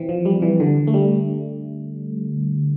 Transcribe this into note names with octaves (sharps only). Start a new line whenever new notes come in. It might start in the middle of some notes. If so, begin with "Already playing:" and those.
Already playing: E3 C4
F3
G3
E3
D3
A3
G3